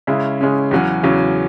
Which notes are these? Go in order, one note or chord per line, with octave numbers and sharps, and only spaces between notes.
C#3 G#3 C#4 E4
C#3 G#3 C#4 E4
E2 C#3 F#3 C#4 F#4
E2 C#3 F#3 C#4 F#4